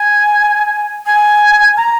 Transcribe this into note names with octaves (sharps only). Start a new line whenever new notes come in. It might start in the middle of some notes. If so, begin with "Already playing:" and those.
Already playing: G#5
G#5
A#5